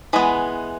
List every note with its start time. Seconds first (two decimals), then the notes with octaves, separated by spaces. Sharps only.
0.13 E3 G#3 B3